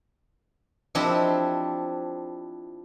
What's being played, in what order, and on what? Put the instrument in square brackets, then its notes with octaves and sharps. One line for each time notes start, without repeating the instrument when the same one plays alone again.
[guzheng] F3 C4 D4 E4 G4 D#5